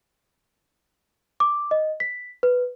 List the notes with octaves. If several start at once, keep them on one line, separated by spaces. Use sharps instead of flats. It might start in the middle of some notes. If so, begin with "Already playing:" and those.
D6
D#5
B6
B4